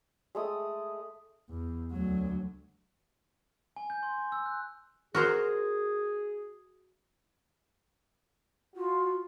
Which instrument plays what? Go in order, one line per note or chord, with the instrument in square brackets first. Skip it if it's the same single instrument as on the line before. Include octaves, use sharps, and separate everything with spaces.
[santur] G#3 A3 D#6
[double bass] E2
D2 F#3
[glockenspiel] G#5
G6
C6
G#5
E6
F#6
[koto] F#4 A#4 C5 [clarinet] G#4
[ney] F4 [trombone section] F#4